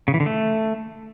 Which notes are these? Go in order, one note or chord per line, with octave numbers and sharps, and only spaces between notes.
C#3
E3
D3
A3